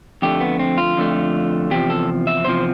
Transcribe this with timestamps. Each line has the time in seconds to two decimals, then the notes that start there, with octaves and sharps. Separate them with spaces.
0.22 F2 D3 A3 G4
0.41 B3
0.59 C4
0.78 F4
0.97 F2 D3 A3
1.71 E2 C3 F3 G4
1.90 A4
2.27 E5
2.44 E2 C3 F3 C5